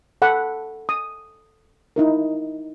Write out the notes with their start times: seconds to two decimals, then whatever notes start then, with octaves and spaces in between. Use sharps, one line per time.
0.22 A4 F#5 B5
0.89 D#6
1.96 D#4 E4 A#4